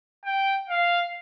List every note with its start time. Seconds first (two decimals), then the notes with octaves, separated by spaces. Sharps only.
0.25 G5
0.69 F5